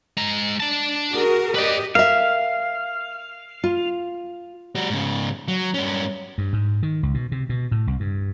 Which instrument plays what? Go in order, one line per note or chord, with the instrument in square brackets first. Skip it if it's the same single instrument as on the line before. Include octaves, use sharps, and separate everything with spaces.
[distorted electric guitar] G#3 A#5
D4 A5
[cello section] F#4 G#4 A#4
[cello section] G4 D#5 [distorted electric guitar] B4 D5
[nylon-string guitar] A#4 E5 [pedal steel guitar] F5
[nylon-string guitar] F4
[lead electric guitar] G3 F#4
G#2 C#3
F#3
G2 C#4
[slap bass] G2
G#2
D#3
C#2
B2
C3
B2
A2
C2
G2